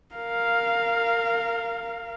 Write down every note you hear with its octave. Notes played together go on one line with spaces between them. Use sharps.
A#4 F5